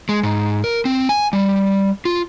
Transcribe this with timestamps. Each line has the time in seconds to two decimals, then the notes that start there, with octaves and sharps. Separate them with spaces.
0.09 G#3
0.23 G#2
0.64 A#4
0.85 C4
1.09 G#5
1.33 G3
2.05 F4